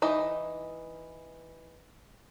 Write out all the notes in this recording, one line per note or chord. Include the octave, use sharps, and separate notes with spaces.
E3 D#4